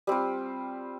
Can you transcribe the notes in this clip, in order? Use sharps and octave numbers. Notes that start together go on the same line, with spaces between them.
G3 C4 F4